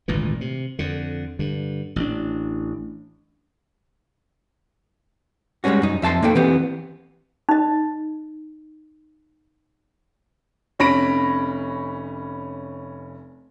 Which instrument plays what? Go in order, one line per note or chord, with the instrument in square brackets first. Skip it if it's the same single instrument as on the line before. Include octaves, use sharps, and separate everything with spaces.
[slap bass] G#1 D2 A#2 E3
C3
F2 D3
G2 D3
A1 D4
[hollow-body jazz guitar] G3 G#3 A#3 C#4 F#4
F#2 D#4
F2 E5 A5 C6
A#3 D#4 A4 G5
E3 B3 C4 G4
[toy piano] D#4 D#5
[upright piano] F1 C#4 B5 A#6 B6 D7